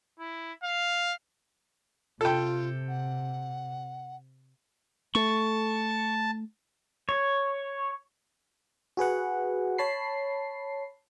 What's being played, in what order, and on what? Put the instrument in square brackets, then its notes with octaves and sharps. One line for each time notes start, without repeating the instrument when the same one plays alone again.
[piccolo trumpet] E4
F5
[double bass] C3 [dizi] F4 [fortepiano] A4 G5
[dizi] F#5
[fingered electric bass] A3 [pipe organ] A5 [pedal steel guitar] C#6
[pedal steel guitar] C#5
[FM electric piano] F#4 G#4 B4 F#5
C#5 A5 B5 C7